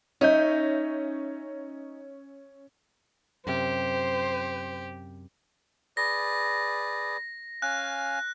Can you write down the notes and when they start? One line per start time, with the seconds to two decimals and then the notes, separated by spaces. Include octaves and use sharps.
0.21 C#4 D#4 E5 G6
3.47 F#2 C3 G4 C5
5.97 G#4 B4 D5 A#6
7.62 C#4 F5 G#5 F#6